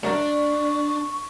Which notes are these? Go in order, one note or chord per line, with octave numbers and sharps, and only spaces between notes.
F#2 F#3 D4 A#4 D5 C#6